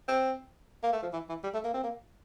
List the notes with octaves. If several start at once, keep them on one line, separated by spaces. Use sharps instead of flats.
C4
A#3
A3
F3
E3
E3
G3
A3
A#3
C4
A#3